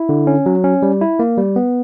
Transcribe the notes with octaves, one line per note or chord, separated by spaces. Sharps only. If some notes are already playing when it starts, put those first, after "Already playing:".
Already playing: E4
D3
C#4
F#3
C#4
G3
E4
A#3
G3
B3